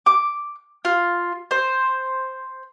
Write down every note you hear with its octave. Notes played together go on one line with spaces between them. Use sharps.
D6
F4
C5